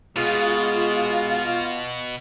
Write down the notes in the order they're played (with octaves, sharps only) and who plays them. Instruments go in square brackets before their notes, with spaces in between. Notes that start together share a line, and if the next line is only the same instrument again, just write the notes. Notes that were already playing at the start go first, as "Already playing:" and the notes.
[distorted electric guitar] B2 [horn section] G#3 [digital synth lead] F4